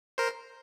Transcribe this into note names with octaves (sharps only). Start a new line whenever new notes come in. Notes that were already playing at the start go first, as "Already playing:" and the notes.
A#4 C5